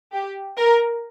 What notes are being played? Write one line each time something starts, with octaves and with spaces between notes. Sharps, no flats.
G4
A#4